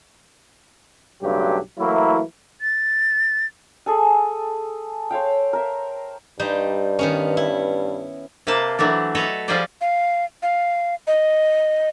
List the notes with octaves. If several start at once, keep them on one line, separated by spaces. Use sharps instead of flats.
B1 G2 C#3 F#3 A3 G4
E3 F#3 A3 A#3 E4
A6
G#4 A4 G#5
C5 C#5 F5 G5
A#4 E5
G2 G3 D#4 C5
D#3 B3 C#4
E4
C3 A#3 B4 C5 A5
E3 F#3 A3 D4
A4 B4 C#5 D#5 E5
F3 G3 G#4 B4 C5 D5
F5
F5
D#5